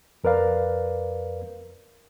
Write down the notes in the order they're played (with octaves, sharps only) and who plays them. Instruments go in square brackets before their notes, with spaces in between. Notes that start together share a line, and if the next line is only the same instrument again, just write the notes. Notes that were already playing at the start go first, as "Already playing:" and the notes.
[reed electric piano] F2 A#4 B4 D5 F5